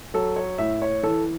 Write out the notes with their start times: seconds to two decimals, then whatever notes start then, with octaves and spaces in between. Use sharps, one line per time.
0.14 F#3 A4
0.36 C#5
0.58 A2 E5
0.82 C#5
1.03 E3 A4